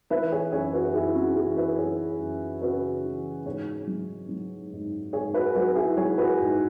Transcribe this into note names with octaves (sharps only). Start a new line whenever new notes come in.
E3 B4 E5
G#4 C#5
F#2 G#4 C#5
F#4 B4
F#2 E4 G#4
C#4 F#4
E3 E4 G#4
B4 E5
F#2 G#4 C#5
F#2
C#3 F#4 B4
E3
G#2 G#4 C#5
F#3
F#3
G#2
G#2 G#4 C#5
F#4 B4
F#3 F#4 B4
E4 G#4
F#3 G#4 C#5
F#4 B4
G#2